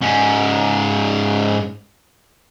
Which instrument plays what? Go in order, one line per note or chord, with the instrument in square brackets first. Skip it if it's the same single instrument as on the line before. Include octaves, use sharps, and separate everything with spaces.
[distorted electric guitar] G#2 C#4